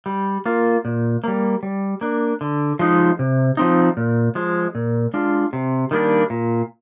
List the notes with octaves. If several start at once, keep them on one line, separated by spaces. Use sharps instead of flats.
G3
A#3 F4
A#2
G3 A#3
G3
A#3 D4
D3
F3 G#3 D#4
C3
F3 C4 D#4
A#2
F3 G#3
A#2
G#3 D4 F4
C3
D#3 G3 A#3 D4
A#2